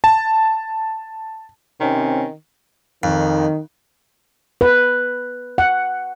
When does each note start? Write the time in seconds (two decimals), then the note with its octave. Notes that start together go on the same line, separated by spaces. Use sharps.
0.04 A5
1.80 C3 D#3 C4 C#4
3.03 F2 D#3
4.61 B4
5.58 F#5